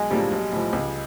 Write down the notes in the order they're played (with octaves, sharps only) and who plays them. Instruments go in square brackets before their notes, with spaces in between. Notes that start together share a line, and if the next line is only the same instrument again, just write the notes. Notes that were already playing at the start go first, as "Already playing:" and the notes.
Already playing: [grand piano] B1 [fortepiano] G#3
[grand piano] A2 F3 A#3 D4 [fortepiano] G3
[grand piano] B1
A2 F3
C#2